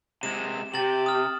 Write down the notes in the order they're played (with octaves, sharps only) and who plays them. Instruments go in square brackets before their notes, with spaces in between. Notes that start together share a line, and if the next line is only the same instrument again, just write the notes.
[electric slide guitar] C3 G#3 [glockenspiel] E7
[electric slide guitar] C3 [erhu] G4 [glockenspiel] A6 F#7
[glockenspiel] D#6 F6